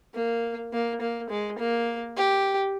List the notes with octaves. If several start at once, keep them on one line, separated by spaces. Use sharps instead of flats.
A#3
A#3
A#3
G#3
A#3
G4